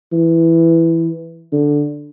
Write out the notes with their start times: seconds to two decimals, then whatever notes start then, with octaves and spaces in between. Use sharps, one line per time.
0.13 E3
1.52 D3